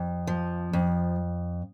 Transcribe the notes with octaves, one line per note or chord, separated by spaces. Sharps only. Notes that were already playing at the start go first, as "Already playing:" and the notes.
Already playing: F2
F3
F2